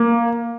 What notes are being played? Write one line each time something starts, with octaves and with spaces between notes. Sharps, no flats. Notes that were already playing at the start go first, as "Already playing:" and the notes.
Already playing: A#3